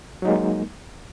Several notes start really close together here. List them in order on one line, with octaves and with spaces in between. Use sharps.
F#3 D#4 G#3 A#3